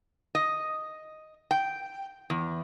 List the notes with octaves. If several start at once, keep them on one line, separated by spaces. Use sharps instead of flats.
D#5
G5
E2